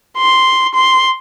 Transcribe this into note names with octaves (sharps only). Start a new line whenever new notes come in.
C6
C6